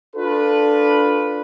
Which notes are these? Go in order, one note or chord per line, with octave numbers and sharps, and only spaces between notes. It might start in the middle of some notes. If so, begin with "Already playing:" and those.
D4 F4 A4 B4